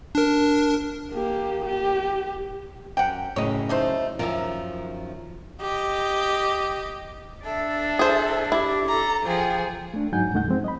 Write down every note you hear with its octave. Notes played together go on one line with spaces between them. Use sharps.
D4 A#4
A#3 G4
G4
F#2 F#5 G5
F#2 A2 C#3 C#5 D#5
A3 D#4 C5
F#2 D#3 F3 A#4 E5
G4 D#5
D4 A4 E5
G#4 C5
E4 G4
A4 A#5
F3 G#4 G5
A3 D4
G#2 F#3 D#4 F#5 G#5 G6
C2 G2 A3 D#4 F#5 G6
F3 G#3 C4
D#5 B5